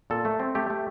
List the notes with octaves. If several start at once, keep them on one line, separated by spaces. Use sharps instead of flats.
A#2 A4
A3
C4
A3 G4
A3